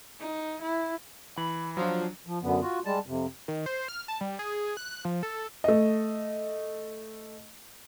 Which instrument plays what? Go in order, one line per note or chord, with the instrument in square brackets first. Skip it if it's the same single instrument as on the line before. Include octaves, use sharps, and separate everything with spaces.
[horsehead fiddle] D#4
E4
[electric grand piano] E3 [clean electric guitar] B5
[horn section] F3 [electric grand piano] F#3 D4
[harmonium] F3
F#2 D3 B3
F4 F#4
G3 G#3 A5
F2 C3
[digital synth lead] D#3
C5
F6
A5
G3
G#4
F#6
F3
A4
[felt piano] A3 D#5